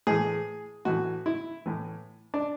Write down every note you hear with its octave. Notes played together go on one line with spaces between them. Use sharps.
A2 E3 G#4
A2 E3 F#4
E4
A2 E3
D4